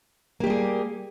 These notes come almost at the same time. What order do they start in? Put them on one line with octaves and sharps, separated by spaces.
A#3 G4 G3 G#4